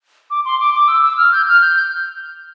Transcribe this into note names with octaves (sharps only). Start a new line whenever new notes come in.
D6
C6
D6
D6
E6
E6
F6
G6
F6
G6
G6